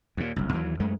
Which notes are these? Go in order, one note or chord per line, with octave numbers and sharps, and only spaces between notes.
D#2 A#2
F#1 C2
D#2 E3 F#3
F#2 G#3 A3